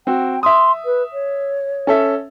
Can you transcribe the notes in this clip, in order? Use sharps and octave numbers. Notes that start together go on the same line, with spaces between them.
C4 F#4 G5
E5 C6 D#6
B4
C#5
C#4 A4 E5